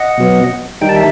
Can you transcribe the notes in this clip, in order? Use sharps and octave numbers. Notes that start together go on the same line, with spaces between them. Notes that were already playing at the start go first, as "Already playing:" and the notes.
Already playing: D#5 F#5
B2 F#3 B3
D#3 G3 D#4 G5
A5
E5